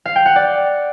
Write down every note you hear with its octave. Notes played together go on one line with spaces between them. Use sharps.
F5
G5
F#5
D5